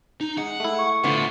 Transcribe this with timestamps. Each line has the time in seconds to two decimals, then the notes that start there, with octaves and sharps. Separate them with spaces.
0.21 D#4
0.38 G#3 F#5
0.60 A3 E4
0.79 C#6
1.04 A2 D3 F3 B3